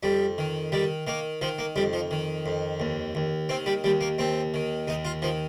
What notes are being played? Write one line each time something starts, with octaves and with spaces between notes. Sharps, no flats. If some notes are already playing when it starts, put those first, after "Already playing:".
F2 G3
D#3
D#3 G3
D#3 A#3
D#3 F3
A#3
F2 G3
F3
D#3
F2
D#2
D#2
D#3 C4
G3
D#2 G3
A#3
D#2 C4
D#3
D#2 D#4
F4
D#3 F3